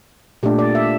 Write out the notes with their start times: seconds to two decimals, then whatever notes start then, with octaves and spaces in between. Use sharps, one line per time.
0.43 A#2 A3 D4 G4
0.59 D5
0.75 E5